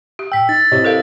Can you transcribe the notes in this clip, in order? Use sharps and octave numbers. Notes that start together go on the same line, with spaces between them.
G4
A2 G5 E6 B6
D#4 A6
C3 E4 C#5 D#5
A4 A#4 F5